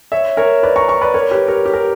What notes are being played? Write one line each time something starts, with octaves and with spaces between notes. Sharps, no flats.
C#5 E5
A#4 C#5
B4 D5
A#5 C#6
A#5 C#6
B4 D5
A#4 C#5
G4 B4
A#4 C#5
G4
A#4